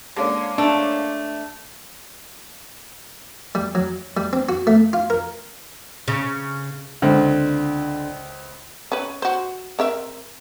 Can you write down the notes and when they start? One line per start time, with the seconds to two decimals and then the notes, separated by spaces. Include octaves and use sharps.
0.16 D3 G#3 A#3 C#4
0.58 A3 D4
3.55 G3
3.75 F#3
4.17 G3
4.33 C4
4.49 F#4
4.67 A3
4.93 F4
5.10 A#4
6.08 C#3
7.02 C#2 D3 C4
8.92 C#4 B4
9.22 F#4 C5
9.79 C4 A#4 E5